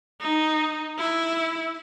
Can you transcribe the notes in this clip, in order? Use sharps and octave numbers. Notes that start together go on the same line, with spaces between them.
D#4
E4